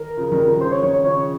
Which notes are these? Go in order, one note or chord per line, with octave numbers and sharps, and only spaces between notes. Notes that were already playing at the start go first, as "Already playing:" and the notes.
Already playing: D#3 A#4
C#3 F3
D#3 G3
C#3 F3
C#3 C5
C#5
D#3 C#5
C#5
C#3 F3 C#5